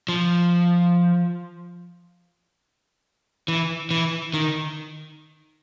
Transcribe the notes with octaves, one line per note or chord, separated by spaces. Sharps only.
F3
E3
E3
D#3